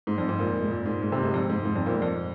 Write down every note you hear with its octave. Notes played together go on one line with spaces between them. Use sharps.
G#2
F2
G#2
A#2
G#2
A#2
G#2
G#2
C3
G#2
F2
G#2
G#2
F2
A#2
G#2
F2